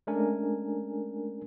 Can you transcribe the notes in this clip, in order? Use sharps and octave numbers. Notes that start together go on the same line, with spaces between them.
G#3 A3 C#4 D4 A#4 G#5